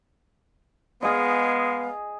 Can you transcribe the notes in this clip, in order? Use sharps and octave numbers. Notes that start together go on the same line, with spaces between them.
G#3 B3 G#4 D#5 F5